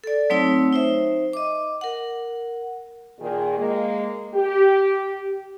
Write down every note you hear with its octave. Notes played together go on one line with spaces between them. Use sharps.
A4 D5
F#3 A3 C4 D#4 C#5 E6
D#4 C5 E5
D#5 D6
A#4 F#5
A#2 D#3 G#4
G#3 A#3
G4